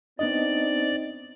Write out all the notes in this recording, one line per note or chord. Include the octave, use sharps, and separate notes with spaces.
B3 C4 D4 D#4 D5 D#5